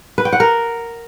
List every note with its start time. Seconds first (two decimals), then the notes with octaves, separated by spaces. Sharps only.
0.18 B4
0.25 G5
0.33 F#5
0.40 A#4